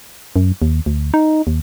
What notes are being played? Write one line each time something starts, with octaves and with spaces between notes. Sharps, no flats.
F#2
D#2
D2
D#4
D#2